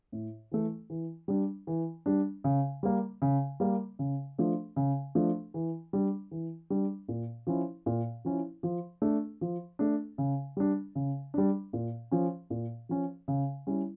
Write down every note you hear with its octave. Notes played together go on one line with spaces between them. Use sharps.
A2
E3 A3
E3
G3 D4
E3
G3 D4
C#3
G3 A#3
C#3
G3 A#3
C#3
F3 A3 D4
C#3
F3 A3 D4
E3
G3 D4
E3
G3 D4
A#2
F3 C#4 E4
A#2
F3 C#4 E4
F3
A3 D4
F3
A3 D4
C#3
G3 D4
C#3
G3 D4
A#2
F3 C#4
A#2
F3 C#4
C#3
G3 C#4 E4